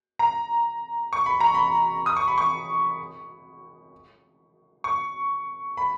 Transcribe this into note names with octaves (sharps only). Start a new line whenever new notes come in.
A#5
C#6
B5
A#5
B5
D#6
C#6
B5
C#6
C#6
B5